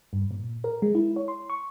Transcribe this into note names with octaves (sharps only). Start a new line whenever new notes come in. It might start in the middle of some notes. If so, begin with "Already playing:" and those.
G2
A#2
A#4
G#3
E4
C#5
C6
C#6